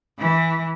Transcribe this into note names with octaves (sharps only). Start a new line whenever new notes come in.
E3